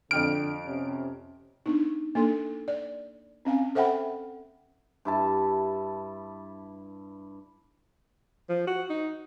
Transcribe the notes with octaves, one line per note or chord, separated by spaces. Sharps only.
F2 D3 G5 F6 D7
C3 C#4
B3 D4 D#4
A#3 D4 A4 C6
D5
C4 C#4 F5 G#5
A4 C5 E5 F#5 G5 B5
G2 E4 A5
F3
F#4
D#4